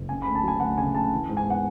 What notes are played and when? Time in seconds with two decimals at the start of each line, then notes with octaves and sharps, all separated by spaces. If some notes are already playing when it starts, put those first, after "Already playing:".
Already playing: F#1
0.09 C#3 G#5
0.22 B5
0.26 D2
0.35 A5
0.44 F#3 G#5
0.60 D2 F#5
0.78 C#3 G#5
0.94 D2 A5
1.12 E3
1.29 G#2
1.37 G#5
1.46 B3 F#5